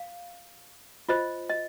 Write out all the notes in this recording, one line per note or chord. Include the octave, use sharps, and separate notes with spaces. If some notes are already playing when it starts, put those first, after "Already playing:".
Already playing: F5
F4 C5 D#5
D#5